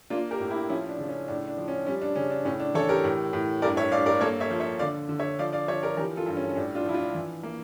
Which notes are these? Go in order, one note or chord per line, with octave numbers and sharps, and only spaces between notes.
A#3 D4 F4
G4 A#4
A2
E4 G4
F3 C#4 E4
D4
C#3
C#4
A2 D4
D4
F3
C#4
G3 C#4
D4
C#3 C#4
D4
A2 C#4
D4
E3 A4 C#5
G4 A#4
A2
A2
G2 A#4 D5
C#5 E5
G2 D5 F5
A#4 D5
A#3 A4 C#5
C#5 E5
F3
C#5 E5
D3 D5 F5
D3
C#5 E5
F3 D5 F5
D5 F5
F3 C#5 E5
A#4 D5
E3 G4 A#4
F4 A4
G2
C#4
C#4
A2 D4
D4 F4
F3 E4
D4 F4
E3
A#3